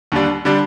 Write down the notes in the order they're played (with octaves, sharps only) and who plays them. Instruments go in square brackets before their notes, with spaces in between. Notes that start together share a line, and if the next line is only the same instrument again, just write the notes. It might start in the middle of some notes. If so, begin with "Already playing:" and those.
[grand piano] D#2 D3 G3 D4
D3 G3 D4